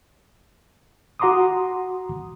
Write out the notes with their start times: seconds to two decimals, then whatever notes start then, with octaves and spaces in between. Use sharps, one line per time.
1.20 F#4 F#5 A#5 C6 D6 D#6